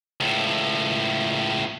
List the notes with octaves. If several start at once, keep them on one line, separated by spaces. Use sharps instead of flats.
C#2 A2